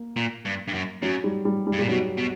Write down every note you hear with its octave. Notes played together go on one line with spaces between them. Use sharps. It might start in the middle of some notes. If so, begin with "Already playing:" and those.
Already playing: A#3
A#2
G2
G2
F#2
F#2 F#3
G3
G3
G3
G2
A#2 G3
B2 F#3
B2